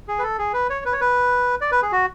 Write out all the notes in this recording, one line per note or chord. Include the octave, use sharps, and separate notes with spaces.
G#4
B4
A4
G#4
B4
C#5
B4
C#5
B4
D5
B4
G#4
F#4